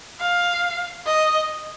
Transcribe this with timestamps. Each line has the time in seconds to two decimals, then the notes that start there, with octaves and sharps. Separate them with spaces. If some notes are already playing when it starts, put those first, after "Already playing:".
0.21 F5
1.06 D#5